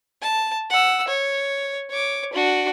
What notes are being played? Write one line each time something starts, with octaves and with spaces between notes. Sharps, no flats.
A5
F#5 E6
C#5
C#5 D6
D4 F#4